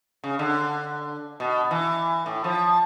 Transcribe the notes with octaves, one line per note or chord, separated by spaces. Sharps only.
C#3
D3
B2
E3
A2
F3